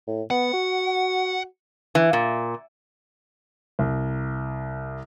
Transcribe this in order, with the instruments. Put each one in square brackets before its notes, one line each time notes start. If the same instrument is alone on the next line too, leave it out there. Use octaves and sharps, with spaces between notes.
[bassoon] A2
[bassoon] B3 [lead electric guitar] F#5
[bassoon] F#4
[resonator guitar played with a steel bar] E3
A#2
[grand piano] C2